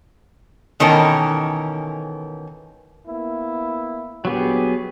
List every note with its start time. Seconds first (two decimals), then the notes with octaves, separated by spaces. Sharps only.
0.80 B2 D#3 E3 C#4 A4 A#4
3.07 A#3 B3 E4
4.25 A#1 F#3 B3 G4 G#4